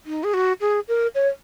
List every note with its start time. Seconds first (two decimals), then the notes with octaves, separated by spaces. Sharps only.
0.06 D#4
0.24 G#4
0.34 F#4
0.61 G#4
0.88 A#4
1.15 C#5